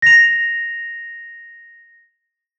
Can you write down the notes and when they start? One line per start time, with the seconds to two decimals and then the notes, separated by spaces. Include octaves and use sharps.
0.02 A#6 F7